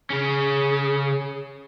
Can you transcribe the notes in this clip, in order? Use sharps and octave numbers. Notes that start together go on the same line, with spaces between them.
C#3 C#4 G#4